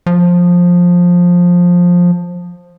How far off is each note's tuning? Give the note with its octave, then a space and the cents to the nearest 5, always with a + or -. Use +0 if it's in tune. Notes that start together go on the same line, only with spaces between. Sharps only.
F3 +15